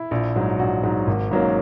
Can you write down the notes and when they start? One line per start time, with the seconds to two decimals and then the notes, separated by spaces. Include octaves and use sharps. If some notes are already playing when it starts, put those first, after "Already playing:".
Already playing: E4
0.11 A#1
0.35 G#2 F#3
0.59 A#1 F#4
0.83 G#2 F#3
1.07 G#1
1.31 G#2 F#3 A#3 C#4